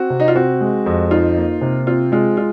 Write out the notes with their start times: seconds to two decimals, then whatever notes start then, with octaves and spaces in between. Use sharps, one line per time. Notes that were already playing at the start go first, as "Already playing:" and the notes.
Already playing: C4 F#4
0.10 C3
0.20 D#4
0.28 F4
0.36 C4 F#4
0.61 G#3
0.86 F2
1.11 D#4 F4
1.37 A#3
1.61 C3
1.87 C4 F4
2.12 G#3 F4
2.37 F4